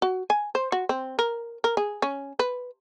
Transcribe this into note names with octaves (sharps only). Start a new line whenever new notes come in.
F#4
G#5
C5
F#4
C4
A#4
A#4
G#4
C#4
B4